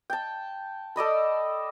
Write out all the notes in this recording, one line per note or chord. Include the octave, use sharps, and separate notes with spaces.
G5 A5
A4 D5 D#5 B5